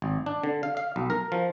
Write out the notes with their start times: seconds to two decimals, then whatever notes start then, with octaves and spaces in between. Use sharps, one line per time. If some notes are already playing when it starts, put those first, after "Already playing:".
0.02 G#1
0.26 D4
0.43 D3
0.63 F5
0.77 F5
0.96 B1
1.10 A#4
1.32 F3